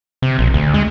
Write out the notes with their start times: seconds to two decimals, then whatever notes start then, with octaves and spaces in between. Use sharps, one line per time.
0.22 C3
0.39 A#1
0.54 D2
0.74 G#3